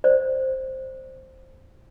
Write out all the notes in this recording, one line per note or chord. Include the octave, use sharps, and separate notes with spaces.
C5 D5